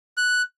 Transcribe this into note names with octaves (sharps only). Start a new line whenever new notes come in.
F#6